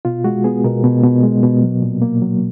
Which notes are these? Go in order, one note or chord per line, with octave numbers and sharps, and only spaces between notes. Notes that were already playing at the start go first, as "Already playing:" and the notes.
B2 F4
G#3 F#4
B3 G#4
B2 A#4
B2
B2
G#3
B2
F#3
A#2
A#3
F#3